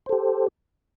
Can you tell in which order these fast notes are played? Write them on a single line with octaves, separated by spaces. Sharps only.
C5 A4 G4